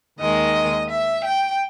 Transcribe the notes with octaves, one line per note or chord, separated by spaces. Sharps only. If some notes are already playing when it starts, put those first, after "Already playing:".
D#2 D#3 G#3 D#5
E5
G5